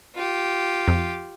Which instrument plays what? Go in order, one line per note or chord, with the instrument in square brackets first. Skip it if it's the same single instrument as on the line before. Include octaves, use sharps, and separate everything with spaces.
[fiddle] F4 G4
[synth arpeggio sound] F2